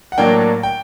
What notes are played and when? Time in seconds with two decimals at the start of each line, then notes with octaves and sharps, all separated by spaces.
0.12 F#5
0.18 A2 F#3 A#3 D4 G5
0.63 G5